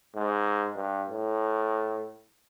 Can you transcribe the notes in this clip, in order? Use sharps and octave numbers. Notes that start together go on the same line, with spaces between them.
G#2
G2
A2